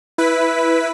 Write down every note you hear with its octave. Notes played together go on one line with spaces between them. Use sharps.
E4 B4 B6